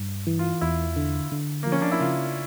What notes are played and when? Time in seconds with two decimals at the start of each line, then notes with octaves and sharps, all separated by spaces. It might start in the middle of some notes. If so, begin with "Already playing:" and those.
Already playing: G2
0.27 E3
0.39 F4
0.61 E2 E4
0.96 D3
1.32 D3
1.63 F3 A#3
1.72 C#4
1.82 D4
1.92 E4
2.01 C#3 F4